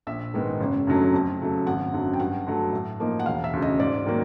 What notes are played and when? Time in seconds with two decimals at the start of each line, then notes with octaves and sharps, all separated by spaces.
0.07 A#1 E5
0.34 G#2 D#3 G#3 B3
0.61 F#1
0.87 F#2 D3 F#3 A3
1.13 F2
1.39 C#3 F#3 A3
1.66 G#1 F#5
1.93 F#2 D3 F#3
2.14 G5
2.20 G2 F#5
2.47 D3 F#3 A3
2.72 A2
3.00 F3 A#3 D#4
3.19 F#5
3.26 E1 F5
3.44 E5
3.53 D2 C#3
3.62 D#5
3.79 G#2 D5
4.06 D#3 F#3 A#3